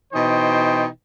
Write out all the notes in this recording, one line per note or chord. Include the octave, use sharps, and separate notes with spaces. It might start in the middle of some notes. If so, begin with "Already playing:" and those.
B2 E3 D#4 C5 G5